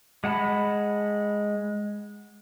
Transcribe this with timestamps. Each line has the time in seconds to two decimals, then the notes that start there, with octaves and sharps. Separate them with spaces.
0.24 G#3 F#5 A5 B5